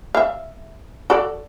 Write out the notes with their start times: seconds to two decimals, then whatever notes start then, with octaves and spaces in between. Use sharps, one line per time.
0.15 E5 F5
1.10 F#4 A4 D5